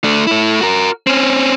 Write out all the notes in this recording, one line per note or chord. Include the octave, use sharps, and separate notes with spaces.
A3 D4
A3 E4
F#4 A#4
C4 C#4